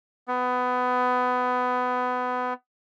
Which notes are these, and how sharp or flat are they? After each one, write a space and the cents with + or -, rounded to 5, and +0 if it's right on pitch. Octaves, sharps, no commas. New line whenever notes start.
B3 +20